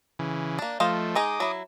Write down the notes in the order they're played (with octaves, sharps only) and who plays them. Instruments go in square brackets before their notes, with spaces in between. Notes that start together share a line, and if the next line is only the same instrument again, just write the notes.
[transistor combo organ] C#3 E3
[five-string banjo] A#3 D4
[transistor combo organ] F3 A3 [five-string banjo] C5 D#5 F5
[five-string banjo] G#3 D#4 G#4 [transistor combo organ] D6 D#6
[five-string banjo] F#3 E4